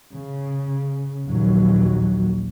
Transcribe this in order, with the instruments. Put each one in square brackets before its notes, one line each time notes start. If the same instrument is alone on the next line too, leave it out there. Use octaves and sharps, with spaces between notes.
[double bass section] C#3
A#1 D#2 F#3